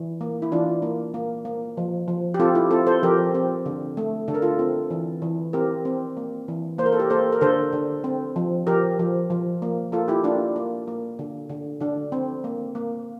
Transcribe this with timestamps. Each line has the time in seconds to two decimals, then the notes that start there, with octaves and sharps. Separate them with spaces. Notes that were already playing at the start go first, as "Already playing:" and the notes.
Already playing: E3
0.21 A#3
0.42 E4
0.52 E3 D4 F4
0.82 A#3
1.14 A#3
1.45 A#3
1.77 F3
2.08 F3
2.34 G4
2.40 C4 F4 A4
2.55 E4 G4
2.71 C4 F4 A4
2.87 A4 C5
3.03 F3 G4 A#4
3.34 C4
3.66 D3
3.97 A3
4.28 D3 A4
4.34 A#4
4.42 F4 A4
4.59 C4
4.90 E3
5.22 E3
5.53 C4 G4 A#4
5.85 C4
6.17 A#3
6.48 E3
6.78 A#3 C5
6.86 A#4
6.92 A4
7.00 G4 A#4
7.10 A#3 A4 C5
7.32 A#4
7.41 D3 A4 C5
7.73 D3
8.04 C4
8.36 F3
8.67 F3 G4 A#4
8.99 F3
9.30 F3
9.62 A#3
9.92 A#3 F4 A4
10.08 E4 G4
10.24 A#3 D4 F4
10.56 A#3
10.87 A#3
11.19 D3
11.49 D3
11.80 D3 D4
12.12 C4
12.44 A#3
12.75 A#3